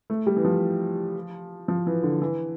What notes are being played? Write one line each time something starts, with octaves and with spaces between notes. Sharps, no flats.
A3
G3
E3
F3
F3
E3
D3
E3